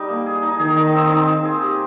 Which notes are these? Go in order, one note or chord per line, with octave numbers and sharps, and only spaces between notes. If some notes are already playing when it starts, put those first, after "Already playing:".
Already playing: G3 D#4
A#3
G#4
D#4
D#3 G#4
D#4
C4
D#4
C4
G#4
G4